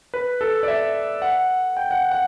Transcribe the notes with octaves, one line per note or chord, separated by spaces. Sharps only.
B4
A4
D5
E5
F#5
G5
F#5
F#5